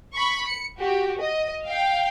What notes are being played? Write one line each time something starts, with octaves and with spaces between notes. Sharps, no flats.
B5 C#6
C#7
F#4 G4
D#5
F5 G5